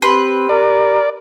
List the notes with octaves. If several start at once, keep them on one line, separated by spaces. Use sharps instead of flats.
C4 G4 B4 C6
A#4 D5